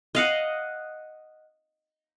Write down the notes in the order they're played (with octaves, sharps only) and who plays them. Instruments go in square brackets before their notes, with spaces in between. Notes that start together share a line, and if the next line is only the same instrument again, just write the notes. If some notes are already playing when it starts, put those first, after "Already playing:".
[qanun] D#5 F5 F#5